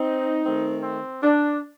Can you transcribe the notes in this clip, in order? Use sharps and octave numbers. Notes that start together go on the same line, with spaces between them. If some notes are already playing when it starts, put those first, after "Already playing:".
Already playing: C4 D#4
D#3 A3 C4
C4
D4